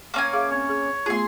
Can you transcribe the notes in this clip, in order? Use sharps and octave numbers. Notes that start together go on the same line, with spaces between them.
A#3 C#4 G#5
G#4 E5 F5 D6
C4 C#5
G#4
A3 B3 F4 G#4 C6